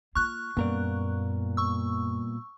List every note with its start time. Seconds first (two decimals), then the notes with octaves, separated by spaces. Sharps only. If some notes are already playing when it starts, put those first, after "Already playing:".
0.15 A#3 F4 C#6 F6 F#6
0.57 F#2 A#2 G3 A#3 B3 A#4 D5
1.57 C#6 E6